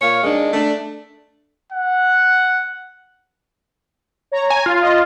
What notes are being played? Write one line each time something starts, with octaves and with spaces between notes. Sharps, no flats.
A#2 C#5 F5
D#3 G#3 D4
A3 D4
F#5
C#5 A#5
G#5
F4
D#5